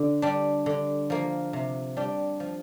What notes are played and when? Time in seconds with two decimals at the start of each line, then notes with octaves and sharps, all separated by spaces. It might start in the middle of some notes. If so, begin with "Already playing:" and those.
Already playing: D3
0.22 G3 D4
0.66 D3
1.10 F3 A#3
1.53 C3
1.97 G3 D4 G4
2.40 F3